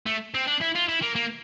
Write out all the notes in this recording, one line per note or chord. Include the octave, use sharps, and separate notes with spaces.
A3
C4
D4
E4
F4
E4
A#3
A#3